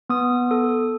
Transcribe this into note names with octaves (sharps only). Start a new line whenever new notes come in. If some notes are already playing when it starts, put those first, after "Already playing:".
B3 D#6
A4